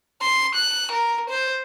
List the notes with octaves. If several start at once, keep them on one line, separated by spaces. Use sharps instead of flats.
C6
F#6
A#4
C5